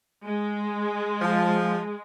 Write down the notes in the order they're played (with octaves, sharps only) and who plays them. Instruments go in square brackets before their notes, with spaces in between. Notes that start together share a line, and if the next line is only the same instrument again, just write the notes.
[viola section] G#3
[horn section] F3